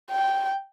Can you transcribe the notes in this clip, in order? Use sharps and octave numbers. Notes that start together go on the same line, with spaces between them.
G5